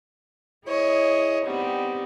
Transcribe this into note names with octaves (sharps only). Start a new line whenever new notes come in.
E4 G#4 C#5 D#5
G3 B3 C4 D#4